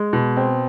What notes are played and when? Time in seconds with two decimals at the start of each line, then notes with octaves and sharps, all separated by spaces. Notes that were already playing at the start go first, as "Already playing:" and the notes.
Already playing: G#3
0.13 B2
0.37 C4